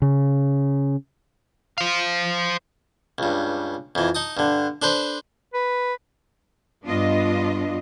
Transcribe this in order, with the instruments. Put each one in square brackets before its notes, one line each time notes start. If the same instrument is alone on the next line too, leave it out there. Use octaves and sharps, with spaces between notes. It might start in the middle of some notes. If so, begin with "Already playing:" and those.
[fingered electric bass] C#3
[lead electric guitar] C5 F5
[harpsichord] C#2 G2
F2 E3
D#4 A5 D#6
G2 D3
D4 A4 B4 C5
[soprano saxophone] B4
[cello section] G2 B3 D4 F4 D#5